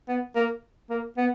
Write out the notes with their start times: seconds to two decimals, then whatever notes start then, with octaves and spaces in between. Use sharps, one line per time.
0.08 B3
0.35 A#3
0.90 A#3
1.17 B3